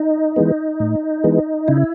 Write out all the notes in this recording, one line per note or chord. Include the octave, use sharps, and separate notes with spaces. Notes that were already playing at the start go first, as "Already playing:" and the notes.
Already playing: D#4
E3 G#3 B3
A2
E3 G#3 B3
C#3 E4